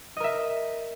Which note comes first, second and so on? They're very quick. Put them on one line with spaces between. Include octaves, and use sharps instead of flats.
D#5 A#4 E5